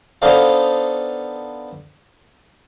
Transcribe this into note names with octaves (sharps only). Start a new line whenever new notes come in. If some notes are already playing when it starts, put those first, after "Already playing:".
B3 D4 D#4 A4 C5 F5